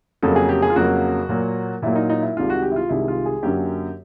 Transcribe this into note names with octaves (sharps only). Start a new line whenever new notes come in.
F2 C#3 F#3 A#3 A4
G#4
G4
G#4
F4
F2 C#3 F#3 A#3 F#4
A#2 F#3 A#3
A#2 F#3 A#3 E4
D#4
D#4
E4
C2 C3 D#3 G#3 F4
F#4
G4
E4
F4
C2 C3 D#3 G#3 E4
F4
G#4
F#2 D3 F#3 A#3 C#4 G4